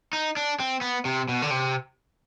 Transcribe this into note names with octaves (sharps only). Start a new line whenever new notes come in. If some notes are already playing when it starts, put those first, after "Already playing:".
D#4
D4
C4
B3
C3
B2
D3
C3